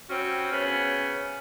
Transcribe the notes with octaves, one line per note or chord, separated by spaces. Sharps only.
G3 C4 C#4 F#4
C#3 B3 C#4